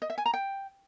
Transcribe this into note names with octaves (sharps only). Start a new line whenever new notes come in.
D#5
E5
G#5
A#5
G5